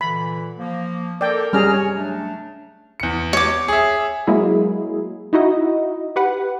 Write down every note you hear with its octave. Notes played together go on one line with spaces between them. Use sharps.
A#2 D3 E3 B5
F3 A#3
A4 A#4 D5 G5
G3 C#4 G#4 A#5 F6
C#5
F#3 A3 D4
E2 C#7
C#5 D6
G#4 E5
F#3 G#3 A#3 E4 G#4
D#4 E4 F#4 D#5
G4 B4 F#5